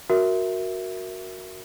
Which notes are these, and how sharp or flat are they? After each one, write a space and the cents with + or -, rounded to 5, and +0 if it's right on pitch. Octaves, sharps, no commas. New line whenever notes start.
F#4 +0 A#4 +0 E5 +0